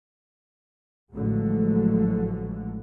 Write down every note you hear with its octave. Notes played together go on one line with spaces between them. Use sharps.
A1 A2 D3 F3 F#3 G#3